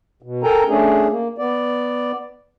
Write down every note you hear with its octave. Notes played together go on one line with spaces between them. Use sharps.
B2
A4 A#4 G5 G#5 A#5
A3 C#4 D4 G#4
A#3
B3 D5